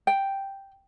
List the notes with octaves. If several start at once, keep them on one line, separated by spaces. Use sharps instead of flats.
G5